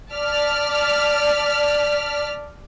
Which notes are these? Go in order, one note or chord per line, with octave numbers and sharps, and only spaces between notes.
D5 A5 F6 B6